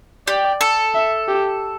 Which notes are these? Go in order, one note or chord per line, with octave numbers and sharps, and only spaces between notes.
G4 D5
A4
E5
G4